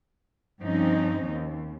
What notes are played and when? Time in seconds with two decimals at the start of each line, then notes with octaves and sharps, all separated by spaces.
0.61 G2 F3 C4 C#4 D#4
1.27 D#2